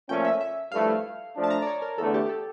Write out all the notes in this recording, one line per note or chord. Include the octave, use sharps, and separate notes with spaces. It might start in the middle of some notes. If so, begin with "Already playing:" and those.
A#2 F3 A3 C#4 G5
E5
E5
G2 F3 A3 E4 F5
F3 A3 D4
A5
A#5
D5
C#5
A#4
E2 D3 A3 A4
G4
G4
A4